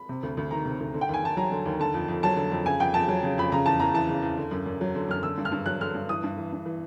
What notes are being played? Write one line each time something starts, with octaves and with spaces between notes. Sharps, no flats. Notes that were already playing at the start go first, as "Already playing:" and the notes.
Already playing: B5
C3
D2
D2
D#3 A#5
C3
D2
D3
G5
D#2 G#5
D#2 A5
F#3 A#5
D3
D#2
D3 A5
F2
F2
F#3 A5
D3
F2
C#3 G#5
F2 G5
F2 A5
F#3
C#3
F2 B5
C#3 A#5
E2 A5
E2 A#5
E3 A5
C#3
E2
D3
F#2
F#2
F#3
D3
F#2 F6
D3 E6
G2
F6
G2
F#3 F#6
D3 F6
G2
E3 D#6
G2
E3
G2
E3